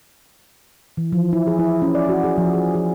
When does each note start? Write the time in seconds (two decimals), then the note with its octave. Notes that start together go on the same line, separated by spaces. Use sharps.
0.97 E3
1.12 F3
1.33 E4
1.47 G#4
1.59 E4
1.82 C#4
1.95 D5
2.09 F#4
2.24 G#4
2.38 F3
2.54 G#4
2.75 G#4